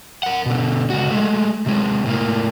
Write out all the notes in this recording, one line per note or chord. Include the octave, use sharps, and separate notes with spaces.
A#4 F#5
B2 D3
C#2 F#4
G#3 A3
C3 G#3
A2 A#3